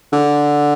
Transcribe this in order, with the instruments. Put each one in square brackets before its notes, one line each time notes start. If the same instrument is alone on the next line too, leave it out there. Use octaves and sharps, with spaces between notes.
[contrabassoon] D3